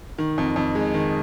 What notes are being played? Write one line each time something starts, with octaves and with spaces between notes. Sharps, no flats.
D#3
F2
F2
G#3
D#3